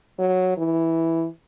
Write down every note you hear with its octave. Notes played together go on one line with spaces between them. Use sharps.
F#3
E3